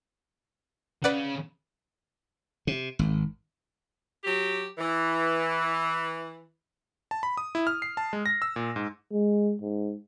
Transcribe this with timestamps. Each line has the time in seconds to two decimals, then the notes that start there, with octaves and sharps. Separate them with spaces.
1.04 C#3 B4 D5 F#5
2.67 C3
2.99 G#1
4.24 F#3 G4
4.78 E3
7.11 A5
7.23 B5
7.37 D#6
7.55 E4
7.67 F6
7.82 C7
7.97 A5
8.13 G#3
8.26 A#6
8.42 E6
8.56 A#2
8.76 G#2
9.12 G#3
9.62 G#2